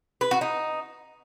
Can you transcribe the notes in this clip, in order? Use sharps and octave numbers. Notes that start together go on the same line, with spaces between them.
B4
F#4
D#4